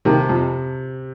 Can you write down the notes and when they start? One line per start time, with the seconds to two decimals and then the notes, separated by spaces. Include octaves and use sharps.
0.05 D#2 C3 D#3
0.29 F2 F3